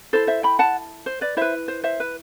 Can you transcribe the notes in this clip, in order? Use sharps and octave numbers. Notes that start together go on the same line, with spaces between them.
E4 A4 C5
C5 E5
G5 B5
F#5 A5
C5
B4 D5
E4 B4 C5 E5
C5
C5 E5
B4